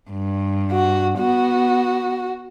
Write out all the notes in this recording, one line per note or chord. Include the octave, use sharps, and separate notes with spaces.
G2
F#4
B3 F#4